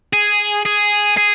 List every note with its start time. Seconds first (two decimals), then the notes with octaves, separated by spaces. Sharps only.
0.13 G#4
0.65 G#4
1.17 G#4